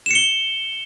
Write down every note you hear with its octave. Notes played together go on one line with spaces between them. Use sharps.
C#7 E7 G7